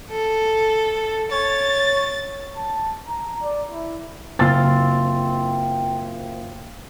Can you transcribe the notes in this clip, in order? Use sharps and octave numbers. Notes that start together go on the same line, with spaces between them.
A4
C#5 A6
A5
A#5
D5
E4
F#1 C4 F4 A6